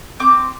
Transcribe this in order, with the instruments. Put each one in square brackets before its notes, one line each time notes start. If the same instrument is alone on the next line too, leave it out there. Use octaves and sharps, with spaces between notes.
[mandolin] C4 D6